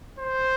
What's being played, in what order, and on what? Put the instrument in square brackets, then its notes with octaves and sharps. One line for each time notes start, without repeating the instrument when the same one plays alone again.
[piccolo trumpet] C5